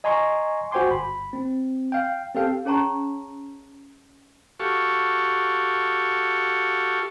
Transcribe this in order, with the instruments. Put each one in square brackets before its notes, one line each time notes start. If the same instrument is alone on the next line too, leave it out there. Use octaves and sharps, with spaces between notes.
[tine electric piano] D#5 G#5 A#5 C6 C#6
F#4 C5 G5 G#5 C6 D6
G1 B5
C4
F5 G5
C4 G4 A4 F5 G5
[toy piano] C#4 G#4 C#5 A5 A#5 C#6
[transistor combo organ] F#4 G4 A4 F5 C#6